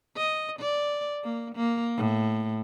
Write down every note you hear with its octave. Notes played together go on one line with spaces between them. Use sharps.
D#5
D5
A#3
A#3
A2